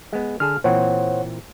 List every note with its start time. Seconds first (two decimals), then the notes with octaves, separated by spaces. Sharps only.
0.13 G#3 B3
0.40 D3 G#4 A5 F6
0.64 A#2 E3 C4 C5 C#5 F#5